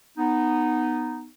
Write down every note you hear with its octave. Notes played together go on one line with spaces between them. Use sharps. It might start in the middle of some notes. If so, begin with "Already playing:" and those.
B3 D#4